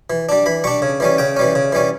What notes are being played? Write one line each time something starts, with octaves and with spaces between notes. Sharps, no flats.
E3
G3 D4
E3 B5
G3 D4 C#6
C#3
E3 G3 C#4
C#3 G5
E3 G3 C#4
C#3
E3 G3 C#4